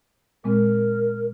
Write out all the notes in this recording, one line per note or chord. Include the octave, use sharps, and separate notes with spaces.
A#2 G#3 C4 A#4